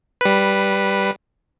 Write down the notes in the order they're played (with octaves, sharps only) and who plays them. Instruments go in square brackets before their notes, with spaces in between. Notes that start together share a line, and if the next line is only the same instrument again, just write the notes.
[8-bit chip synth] G3 B4